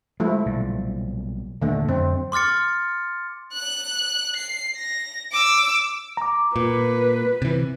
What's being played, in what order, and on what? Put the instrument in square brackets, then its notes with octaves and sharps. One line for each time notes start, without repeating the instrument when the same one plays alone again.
[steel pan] F3 A3 E4 [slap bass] G#3
[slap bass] B1 A#2 G3
[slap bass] D#2 A#2 D#3 [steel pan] D3 A3
[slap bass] F2 F#3 [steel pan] C4
[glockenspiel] C6 D6 F6 A6 C#7
[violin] F#6
C7
A#6
D6 E6
[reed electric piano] A#5 D6
[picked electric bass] A#2 [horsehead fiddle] B4
[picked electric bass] C3 E3